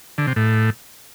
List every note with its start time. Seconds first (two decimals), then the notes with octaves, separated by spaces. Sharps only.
0.18 D3
0.27 C3
0.36 A2